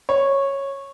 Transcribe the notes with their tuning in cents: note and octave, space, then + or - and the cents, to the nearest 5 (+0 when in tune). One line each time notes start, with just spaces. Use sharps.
C#5 -10